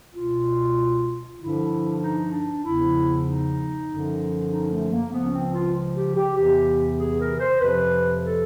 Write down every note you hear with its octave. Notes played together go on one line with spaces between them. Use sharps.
C#2 B2 F4
G2 D3 F3 E4
D#4
D4
E2 C#3 F3 E4
D#4
F#2 D3 F3
D#4
A3
A#3
C#2 C#3 F3 B3
C#4
C4
F4
G4
G4
E2 C3 E3 G4
G#4
A#4
C5
F2 C3 F3 B4
A4